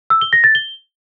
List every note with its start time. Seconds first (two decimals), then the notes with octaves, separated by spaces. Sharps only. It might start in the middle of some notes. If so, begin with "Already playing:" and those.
0.10 E6
0.21 G7
0.33 A#6
0.44 A6
0.55 G7